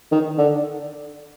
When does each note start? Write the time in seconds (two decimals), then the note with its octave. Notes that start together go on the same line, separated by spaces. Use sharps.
0.12 D#3
0.38 D3